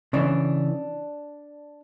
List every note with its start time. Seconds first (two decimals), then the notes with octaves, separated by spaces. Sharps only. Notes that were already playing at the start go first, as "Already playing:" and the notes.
0.13 C#3 E3 D4